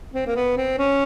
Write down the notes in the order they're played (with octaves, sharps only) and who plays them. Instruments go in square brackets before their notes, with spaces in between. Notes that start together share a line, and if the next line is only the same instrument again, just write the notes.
[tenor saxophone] C4
A#3
B3
C4
C#4